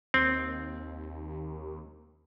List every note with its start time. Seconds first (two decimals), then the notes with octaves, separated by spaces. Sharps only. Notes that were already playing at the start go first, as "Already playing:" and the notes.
0.14 D#2 C4